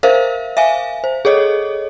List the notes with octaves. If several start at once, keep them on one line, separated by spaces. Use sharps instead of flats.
A#4 C5 E5 F5
E5 F5 G#5
C5
G#4 A4 C#5 D#5